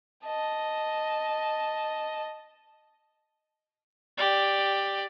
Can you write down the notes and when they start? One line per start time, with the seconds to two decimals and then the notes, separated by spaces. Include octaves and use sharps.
0.25 D#5 A5
4.18 G4 D5